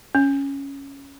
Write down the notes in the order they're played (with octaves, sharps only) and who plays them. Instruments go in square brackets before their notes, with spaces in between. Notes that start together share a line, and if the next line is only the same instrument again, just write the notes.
[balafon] C#4